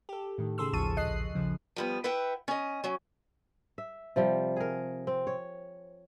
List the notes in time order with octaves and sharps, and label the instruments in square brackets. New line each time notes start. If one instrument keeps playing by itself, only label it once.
[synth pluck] G4 A4
A2 D#3
C#3 G#4 A4 C6 E6
A1 D#2 F3 A5 C#6 D#7
A#1 D#5 F#6 C7
C#3 F3
[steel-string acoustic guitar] F3 G3 B3
E4 B4 E5 F#5 G5
C#4 D#5
F#3 C#4
[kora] E5
C3 F3 G3
G#4 A#4
C4
C#5